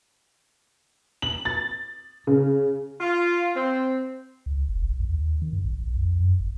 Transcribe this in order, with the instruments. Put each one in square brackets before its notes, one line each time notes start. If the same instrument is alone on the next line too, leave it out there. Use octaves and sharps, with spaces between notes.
[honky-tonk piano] F#7
A6
C#3
[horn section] F4
C4
[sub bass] C#2
F#1
A#1
E2
D#2
D#3
G2
A#1
B1
F2
F#2
G1